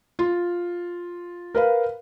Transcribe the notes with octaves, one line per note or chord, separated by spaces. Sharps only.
F4
A#4 B4 F5